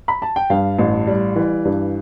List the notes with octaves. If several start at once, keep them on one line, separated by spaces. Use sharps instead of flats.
B5
A5
G5
G2 F5
A1
G3
E3
G2